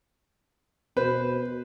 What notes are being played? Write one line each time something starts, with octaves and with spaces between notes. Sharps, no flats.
B2 B4 C5